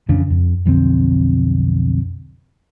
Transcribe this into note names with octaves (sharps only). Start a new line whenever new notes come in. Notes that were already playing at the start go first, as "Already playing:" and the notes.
A1 F2 C#3 D4
F2
B1 F2 D3 C4